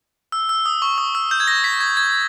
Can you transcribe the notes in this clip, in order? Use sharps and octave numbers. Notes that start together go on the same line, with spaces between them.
E6
E6
D#6
C#6
D#6
E6
G6
G#6
A#6
B6
G#6
G#6